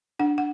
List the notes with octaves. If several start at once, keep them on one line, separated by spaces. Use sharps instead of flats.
D4 F#5
F#5